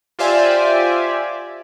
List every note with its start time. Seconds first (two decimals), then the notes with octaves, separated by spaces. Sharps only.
0.19 F4 G4 C5 D5 E5 G#5